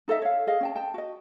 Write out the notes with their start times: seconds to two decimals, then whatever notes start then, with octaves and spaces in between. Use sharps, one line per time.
0.08 D#4 A4 D#5 E5
0.22 C#5 F5
0.47 G#4 D#5 F5
0.61 C#4 G5 A5
0.76 G5 A5
0.94 F#4 D#5